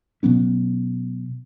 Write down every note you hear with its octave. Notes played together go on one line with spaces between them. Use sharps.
B2 F#3 B3 C#4